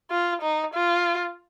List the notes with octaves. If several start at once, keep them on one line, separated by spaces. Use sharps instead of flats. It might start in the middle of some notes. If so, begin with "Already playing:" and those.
F4
D#4
F4